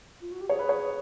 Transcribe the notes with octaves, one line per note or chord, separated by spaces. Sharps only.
F4
F#4
G4
G#4 C#5
B4
C#5